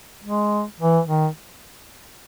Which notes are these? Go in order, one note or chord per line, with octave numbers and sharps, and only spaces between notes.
G#3
E3
D#3